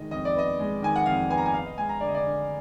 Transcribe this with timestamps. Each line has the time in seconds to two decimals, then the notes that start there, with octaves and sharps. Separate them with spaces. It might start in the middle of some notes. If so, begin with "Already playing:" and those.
Already playing: D#3 G#3 D#5
0.11 F2 D#5
0.25 D5
0.35 B3 D#5
0.59 G#3
0.82 D#3 G#5
0.96 F#5
1.06 F2 F5
1.30 B3 G#5
1.38 A#5
1.46 G#5
1.53 B3 F5
1.66 D#5
1.78 G#3 G#5
1.89 A#5
2.01 D3 D5
2.08 D#5
2.15 D5
2.25 D3